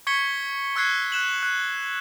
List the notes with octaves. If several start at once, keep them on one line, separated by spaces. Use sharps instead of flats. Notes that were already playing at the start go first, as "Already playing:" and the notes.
C#6 G#6 B6 C#7 G7
C#6 E6 F#6 G#6 C7
F#6 E7 F#7
F#6